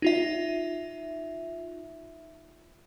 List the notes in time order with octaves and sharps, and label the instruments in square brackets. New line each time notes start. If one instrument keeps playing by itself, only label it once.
[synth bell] D#4 F4 E5